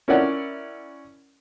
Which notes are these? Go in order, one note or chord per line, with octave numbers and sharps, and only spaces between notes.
C#4 E4 A#4 C#5 D5 F#5